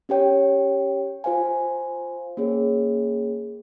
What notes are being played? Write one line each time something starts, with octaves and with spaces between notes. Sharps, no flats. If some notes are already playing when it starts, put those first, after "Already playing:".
C#4 G4 C#5 G5
F4 C5 F5 G#5
A#3 C#4 G#4 C#5